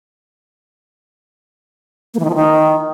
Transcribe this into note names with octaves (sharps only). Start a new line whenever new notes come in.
A#3
E3
D#3
F3
D#3